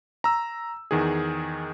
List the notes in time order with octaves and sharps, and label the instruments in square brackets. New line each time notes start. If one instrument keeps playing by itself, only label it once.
[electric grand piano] A#5 E6
E2 D#3 G#4